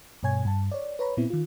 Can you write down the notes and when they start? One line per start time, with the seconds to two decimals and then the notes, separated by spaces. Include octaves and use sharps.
0.23 G2 B2 C#5 G#5 G#6
0.45 G2 A5
0.71 C#5 D5
0.99 B4 C#5 A#5 B5
1.17 A#2 B3 C4 E4
1.30 D#3 F4